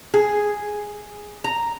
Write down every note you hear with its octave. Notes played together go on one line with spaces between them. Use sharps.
G#4
A#5